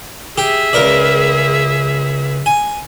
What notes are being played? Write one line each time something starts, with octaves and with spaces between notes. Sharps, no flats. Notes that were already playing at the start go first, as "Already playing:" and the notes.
G4 G#4 E5
C#2 A#4 D5
G#5